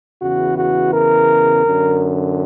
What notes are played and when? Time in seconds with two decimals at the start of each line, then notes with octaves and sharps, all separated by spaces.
0.22 E2 C#3 E3 F#4
0.57 F#4
0.93 A#4
1.65 F#2 D3